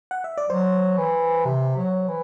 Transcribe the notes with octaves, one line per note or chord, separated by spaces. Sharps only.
F#5
E5
D5
F#3 C5
E3
C3
F#3
E3